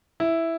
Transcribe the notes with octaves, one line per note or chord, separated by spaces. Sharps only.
E4